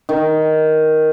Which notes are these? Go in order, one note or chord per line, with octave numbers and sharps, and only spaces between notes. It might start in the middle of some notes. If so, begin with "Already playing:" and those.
D#3